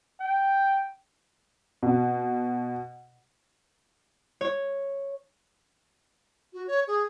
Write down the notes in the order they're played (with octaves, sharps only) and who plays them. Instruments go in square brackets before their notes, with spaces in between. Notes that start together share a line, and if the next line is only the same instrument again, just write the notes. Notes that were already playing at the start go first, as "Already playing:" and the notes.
[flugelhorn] G5
[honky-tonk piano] B2
[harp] C#5
[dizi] F#4
C#5
G#4